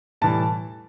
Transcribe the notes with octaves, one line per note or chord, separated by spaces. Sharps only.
A2 E3 G3 A5